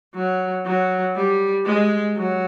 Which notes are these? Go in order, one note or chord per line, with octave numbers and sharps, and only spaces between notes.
F#3
F#3
G3
G#3
F#3